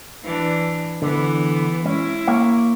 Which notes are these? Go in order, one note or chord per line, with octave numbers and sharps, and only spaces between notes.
E3 D4
D3 E3 B3
G#3 C#4 E4
A#3 C#5 F5